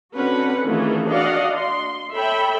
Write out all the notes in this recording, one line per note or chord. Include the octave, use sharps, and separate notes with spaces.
D3 C4 C#4 F#4 B4 F#5
D#3 E3 A3 C#4 F4 G#4
D4 F#4 D5 D#5 F5 F#5
C6
A4 C#5 E5 G5 B5